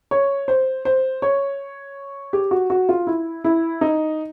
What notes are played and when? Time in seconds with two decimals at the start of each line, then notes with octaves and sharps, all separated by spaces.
0.11 C#5
0.48 C5
0.85 C5
1.22 C#5
2.33 G4
2.51 F#4
2.70 F#4
2.89 F4
3.07 E4
3.44 E4
3.81 D#4